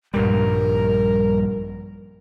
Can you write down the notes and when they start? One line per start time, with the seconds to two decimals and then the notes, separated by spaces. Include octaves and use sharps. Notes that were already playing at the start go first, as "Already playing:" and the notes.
0.14 A#1 G2 G3 A#4